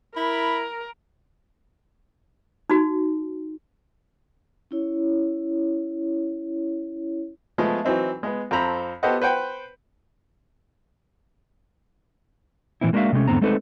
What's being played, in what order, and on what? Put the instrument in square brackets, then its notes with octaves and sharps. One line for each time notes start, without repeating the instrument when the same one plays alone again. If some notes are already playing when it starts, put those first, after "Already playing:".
[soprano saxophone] E4 [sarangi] A#4 [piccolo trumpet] B5
[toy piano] D#4 F#4
[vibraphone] C#4 E4 C#5
[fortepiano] F3 G#3 A3 B3
E3 F#3 C4 D#4
G#3 B3
F2 C4 A4 C5 A#5 B5
B3 G4 A4 C5 D#5 F#5
B4 C5 F#5 G5
[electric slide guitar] A#2 E3 A#3 C4 E4
G#3 A#3 D4 F#4 E5 F5
C3 G#3 A3 B3 C#4
E2 G#2 D3 B3 C4 A#5
G#3 A3 C4 D#4 A4 B4